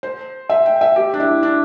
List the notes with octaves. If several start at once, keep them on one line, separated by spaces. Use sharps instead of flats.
C5
E5
G5
E5
G4
D4
E4
D4